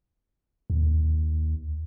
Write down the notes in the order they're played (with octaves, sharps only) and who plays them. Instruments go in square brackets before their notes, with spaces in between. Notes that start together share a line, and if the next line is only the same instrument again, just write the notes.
[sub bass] D#2